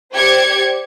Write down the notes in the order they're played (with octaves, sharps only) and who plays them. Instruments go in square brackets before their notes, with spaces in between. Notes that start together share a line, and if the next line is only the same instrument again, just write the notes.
[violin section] G4 C5 D5 G#6 C#7